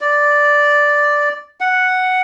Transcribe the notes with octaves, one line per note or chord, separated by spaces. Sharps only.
D5
F#5